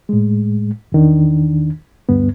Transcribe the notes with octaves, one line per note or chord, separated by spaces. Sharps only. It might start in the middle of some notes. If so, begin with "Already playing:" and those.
A2 G#3
E2 D#3 D4
D2 G2 B3